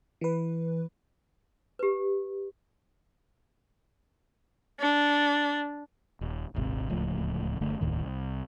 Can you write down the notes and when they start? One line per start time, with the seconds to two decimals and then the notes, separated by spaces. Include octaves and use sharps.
0.21 E3 B4
1.79 G4 B4
4.79 D4
6.21 D#1
6.54 D#1 G#1 C3
6.89 D1 C#2 A2 F3
7.61 F#1 D3 A3
7.81 F1 D2 A2 D#3
8.00 C2